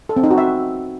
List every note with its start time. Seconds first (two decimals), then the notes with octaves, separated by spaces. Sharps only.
0.09 A4
0.16 C4
0.24 D#4
0.31 F#4
0.38 E5